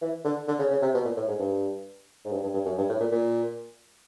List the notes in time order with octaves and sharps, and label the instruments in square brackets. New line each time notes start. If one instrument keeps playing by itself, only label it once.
[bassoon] E3
D3
D3
C#3
C#3
C3
B2
A#2
A2
G#2
G2
G#2
G2
G2
G2
F#2
G2
A2
A#2
A#2